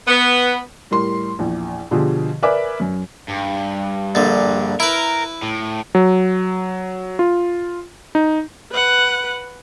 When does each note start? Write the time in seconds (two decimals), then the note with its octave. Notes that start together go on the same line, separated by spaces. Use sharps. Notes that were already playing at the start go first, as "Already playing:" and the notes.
0.08 B3
0.91 A2 G3 A#4 C6
1.39 A#1 E2
1.91 B2 D3 F3 F4 G4 G#4
2.42 A#4 B4 D5 E5 G#5 D6
2.80 F#2
3.28 G2
4.15 A#1 D3
4.80 E4 A#4 B4
5.43 A2
5.95 F#3
7.19 F4
8.15 D#4
8.72 B4 F#5